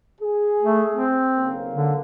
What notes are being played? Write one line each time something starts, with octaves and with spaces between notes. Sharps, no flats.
G#4
A3
C4
B1 C#3 A#3
D3